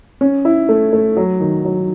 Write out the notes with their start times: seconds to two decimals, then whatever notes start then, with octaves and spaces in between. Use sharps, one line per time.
0.21 C#4
0.45 E4
0.69 A3
0.93 A3
1.17 F#3
1.40 D#3
1.65 F#3